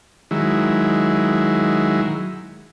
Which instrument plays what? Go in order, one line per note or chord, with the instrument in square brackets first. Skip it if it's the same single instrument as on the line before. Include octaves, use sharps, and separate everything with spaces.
[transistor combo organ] D#3 F#3 G#3 E4